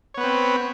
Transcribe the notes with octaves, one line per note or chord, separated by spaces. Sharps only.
B3 C4 B4 C#5